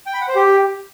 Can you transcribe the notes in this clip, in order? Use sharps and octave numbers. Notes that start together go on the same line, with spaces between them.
G5
B5
F#5
C5
G4